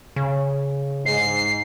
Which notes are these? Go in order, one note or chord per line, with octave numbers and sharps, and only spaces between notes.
C#3
G#2 C7